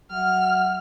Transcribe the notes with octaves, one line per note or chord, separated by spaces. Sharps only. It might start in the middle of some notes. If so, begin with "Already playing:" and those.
F#3 E5 F#5 F6